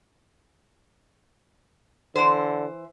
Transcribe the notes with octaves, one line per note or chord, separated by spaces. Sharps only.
D3 E3 C5